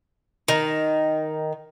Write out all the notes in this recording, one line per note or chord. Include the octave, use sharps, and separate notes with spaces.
D#3